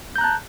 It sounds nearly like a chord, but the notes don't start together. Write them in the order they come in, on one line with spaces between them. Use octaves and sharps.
G6 A#5 F#6 A5